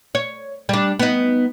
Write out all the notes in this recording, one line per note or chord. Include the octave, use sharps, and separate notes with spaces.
C#5
G3 D4
B3 D#4